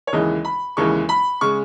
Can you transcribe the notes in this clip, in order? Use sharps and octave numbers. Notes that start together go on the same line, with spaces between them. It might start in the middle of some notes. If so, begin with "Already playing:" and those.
C#5
D#2 C#3 E3 G#3 D#5
B5
D#2 C#3 E3 G#3 C#6
B5
C#3 G#3 C#6